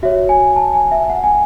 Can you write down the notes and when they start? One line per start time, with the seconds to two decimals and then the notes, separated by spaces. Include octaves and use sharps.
0.03 F#4 C#5 E5
0.29 G#5
0.56 A5
0.74 G#5
0.91 E5
1.10 F#5
1.24 G#5